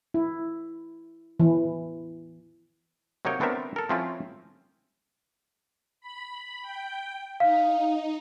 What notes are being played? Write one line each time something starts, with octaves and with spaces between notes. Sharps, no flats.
E4
E3
C3 F#3 A#3 D#4 C#5 G5
A3 B3 C4 D4 A#4 E5
A4 A#4
F3 A3 C4 C#4 E4 F4
B5
G5
D#4 F5